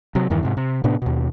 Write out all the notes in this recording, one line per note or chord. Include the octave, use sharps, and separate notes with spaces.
C3 F#3
E2 G2 D#3 E3
G#2 C3
C3
A2 C3 B3 D4
D#2 B2